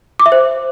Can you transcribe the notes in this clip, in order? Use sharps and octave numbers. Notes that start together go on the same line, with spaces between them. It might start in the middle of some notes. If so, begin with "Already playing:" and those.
D6
E5
C5